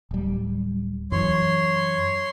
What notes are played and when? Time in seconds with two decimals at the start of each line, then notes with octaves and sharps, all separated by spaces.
0.11 D1 G3
1.12 F#2 E3 C#5 C6